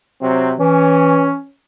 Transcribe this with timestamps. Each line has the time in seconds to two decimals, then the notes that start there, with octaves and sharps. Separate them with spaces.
0.22 C3 F#3 C4
0.60 E3 C#4